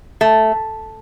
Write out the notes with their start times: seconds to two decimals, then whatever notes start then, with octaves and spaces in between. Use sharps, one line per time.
0.21 A3